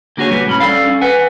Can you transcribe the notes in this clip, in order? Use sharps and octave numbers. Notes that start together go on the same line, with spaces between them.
D3 A#3 F#4 G#4 C#5
C2 G3 B3 F#4
A2 C#4 B5
G3 C#4 A4 D5 F5
C#4
B4 F#5 G#5